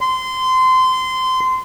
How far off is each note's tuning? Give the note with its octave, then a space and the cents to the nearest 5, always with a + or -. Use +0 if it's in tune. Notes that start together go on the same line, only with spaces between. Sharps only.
C6 -20